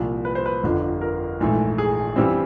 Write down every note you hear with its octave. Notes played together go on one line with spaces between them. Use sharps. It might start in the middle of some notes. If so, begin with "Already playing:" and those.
Already playing: C2 A#2 F3
B4
C5
B4
G1 F2 D3
A#4
A#1 G#2 E3 A3
G#4
G2 E3 G3 C4